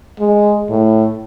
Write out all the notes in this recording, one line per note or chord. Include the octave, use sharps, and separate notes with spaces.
G#3
A2